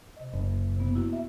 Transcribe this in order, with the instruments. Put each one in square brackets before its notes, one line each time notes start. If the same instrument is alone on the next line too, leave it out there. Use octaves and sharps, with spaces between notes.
[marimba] C3 D#5
[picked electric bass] F#1
[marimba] C3 B3
A#3 E4 F#4
E5